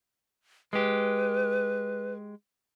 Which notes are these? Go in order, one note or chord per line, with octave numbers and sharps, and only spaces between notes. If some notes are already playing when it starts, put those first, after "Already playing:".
G#3 G4 B4